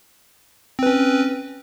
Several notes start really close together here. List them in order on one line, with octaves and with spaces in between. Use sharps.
C4 B4 C#4